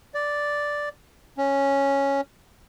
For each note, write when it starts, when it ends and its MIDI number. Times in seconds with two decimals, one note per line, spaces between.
0.14 0.89 74
1.37 2.21 61